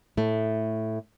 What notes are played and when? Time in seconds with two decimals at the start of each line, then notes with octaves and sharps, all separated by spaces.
0.17 A2 A3